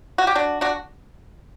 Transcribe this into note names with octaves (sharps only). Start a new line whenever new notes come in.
F#4
G4
D4 F#4
D4 F#4